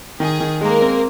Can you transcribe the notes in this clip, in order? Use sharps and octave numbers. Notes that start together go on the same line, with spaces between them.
D#3 G#4
D#3
G#3 A#3 A#4
C4